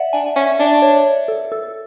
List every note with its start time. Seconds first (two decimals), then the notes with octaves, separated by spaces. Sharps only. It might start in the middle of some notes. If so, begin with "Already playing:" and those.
Already playing: D5 E5 F#5
0.13 D4 G#5
0.36 C#4 E5
0.59 D4 D5
0.82 C#5
1.28 A4
1.52 A4